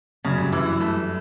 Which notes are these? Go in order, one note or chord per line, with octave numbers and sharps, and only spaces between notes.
F#2 C#3
G2
F#2 E3
G2 A3